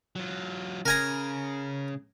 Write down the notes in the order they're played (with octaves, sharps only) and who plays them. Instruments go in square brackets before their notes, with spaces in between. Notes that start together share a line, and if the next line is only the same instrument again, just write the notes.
[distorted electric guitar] F#3 F4
[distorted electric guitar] C#3 [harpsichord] A#4 G#5 A#5